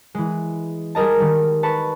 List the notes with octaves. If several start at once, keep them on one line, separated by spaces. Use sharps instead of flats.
E3 G#3
G3 G#4 A#4 D#5 A5
D#3 G3
B4 A5 C#6